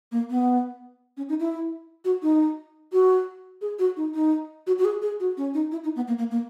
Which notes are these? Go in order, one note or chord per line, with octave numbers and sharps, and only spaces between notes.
A#3
B3
C#4
D#4
E4
F#4
D#4
F#4
G#4
F#4
D#4
D#4
F#4
F#4
G#4
G#4
F#4
C#4
D#4
E4
D#4
B3
A#3
A#3
A#3